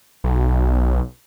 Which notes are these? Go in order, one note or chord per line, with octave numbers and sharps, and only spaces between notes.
B1